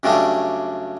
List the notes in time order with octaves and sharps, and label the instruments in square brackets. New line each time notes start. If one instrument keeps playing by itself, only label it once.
[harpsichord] F#2 C#3 G3 A3 D4